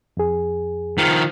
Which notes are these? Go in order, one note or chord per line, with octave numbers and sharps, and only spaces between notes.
F2 G#4
D#3 F3